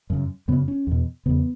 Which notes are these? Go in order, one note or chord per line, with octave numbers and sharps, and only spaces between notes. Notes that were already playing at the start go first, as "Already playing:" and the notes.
F#2 C#3
F#2 C#3 B3
C#4
E2 B2
E2 C#3 B3